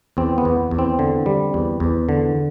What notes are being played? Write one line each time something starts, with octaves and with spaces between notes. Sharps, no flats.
E2 C4
B3
E2
E2
C4
D3
G3
E2
E2
D3